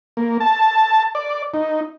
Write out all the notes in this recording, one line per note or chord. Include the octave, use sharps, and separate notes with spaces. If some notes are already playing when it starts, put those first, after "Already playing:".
A#3
A5
D5
D#4